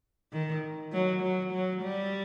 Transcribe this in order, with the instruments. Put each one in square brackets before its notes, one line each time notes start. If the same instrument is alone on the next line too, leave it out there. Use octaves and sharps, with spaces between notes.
[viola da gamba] D#3
F#3
F#3
F#3
G3